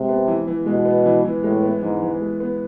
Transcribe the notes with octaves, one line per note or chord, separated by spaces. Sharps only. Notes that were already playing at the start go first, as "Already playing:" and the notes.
Already playing: C3 G#3
B3
E3
E3
B2 G#3
B3
E3
E3
A2 G#3
B3
G#2 E3
E3
G#3
B3